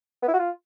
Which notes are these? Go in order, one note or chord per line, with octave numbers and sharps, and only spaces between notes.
B3
E4
F#4
F4